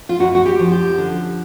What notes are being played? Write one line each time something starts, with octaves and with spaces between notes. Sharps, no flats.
F4
F#2 F#4
F#4
G4
F3
G4
D3